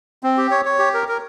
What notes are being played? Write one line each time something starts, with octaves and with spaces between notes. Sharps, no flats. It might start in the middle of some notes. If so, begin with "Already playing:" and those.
C4
G4
C#5
C#5
G4
A#4
A#4